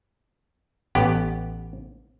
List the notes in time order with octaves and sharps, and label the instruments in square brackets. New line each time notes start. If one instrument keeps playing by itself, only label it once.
[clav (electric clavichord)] A1 B3 G4